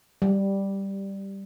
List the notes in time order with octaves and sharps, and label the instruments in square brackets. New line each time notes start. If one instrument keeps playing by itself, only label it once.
[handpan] G3